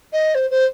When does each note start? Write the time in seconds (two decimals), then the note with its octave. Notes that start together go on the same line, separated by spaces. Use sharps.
0.12 D#5
0.35 C5
0.50 C5